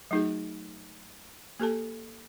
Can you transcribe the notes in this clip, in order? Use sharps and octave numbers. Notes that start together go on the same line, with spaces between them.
F#3 A3 D#4 F#4 G#4
A#3 G4 A4 A5